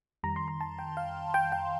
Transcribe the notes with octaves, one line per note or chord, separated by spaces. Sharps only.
F2 D#3 G3 A#5
C6
A#5
A5
G5
F5
G5
G5